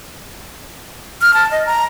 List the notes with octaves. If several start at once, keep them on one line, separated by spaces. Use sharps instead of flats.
F6
A5
D#5
A#5